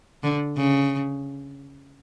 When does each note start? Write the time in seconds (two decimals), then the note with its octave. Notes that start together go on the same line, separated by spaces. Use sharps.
0.24 D3
0.57 C#3